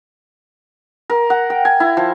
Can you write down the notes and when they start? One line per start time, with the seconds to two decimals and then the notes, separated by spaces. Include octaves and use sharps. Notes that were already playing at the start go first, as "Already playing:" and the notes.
1.10 A#4
1.30 F#5
1.50 G5
1.65 G#5
1.80 E4
1.97 F3